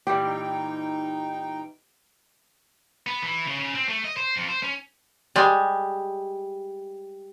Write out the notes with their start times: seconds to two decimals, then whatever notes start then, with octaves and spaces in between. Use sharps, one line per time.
0.07 A#2 E3 G3 G4
0.22 D#4 G5
3.07 B3
3.22 E3
3.47 C#3
3.60 C#3
3.75 C4
3.89 A3
4.04 D#5
4.17 C5
4.36 F2
4.49 C5
4.63 C#4
5.36 G3 G#3